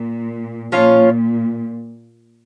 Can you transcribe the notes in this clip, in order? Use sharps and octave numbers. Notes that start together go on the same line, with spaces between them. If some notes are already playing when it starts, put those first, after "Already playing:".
Already playing: A#2
A#2 F3 C#4 F4 C#5